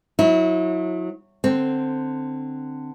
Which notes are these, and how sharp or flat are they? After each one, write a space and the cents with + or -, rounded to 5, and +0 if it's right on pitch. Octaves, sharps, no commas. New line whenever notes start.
F#3 -30 E4 -30
D3 +15 C4 +0